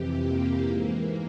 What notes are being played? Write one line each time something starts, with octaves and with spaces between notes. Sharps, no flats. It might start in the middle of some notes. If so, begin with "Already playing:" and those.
Already playing: F2 C3 E3 G4
A#3
G#2 E3 A#3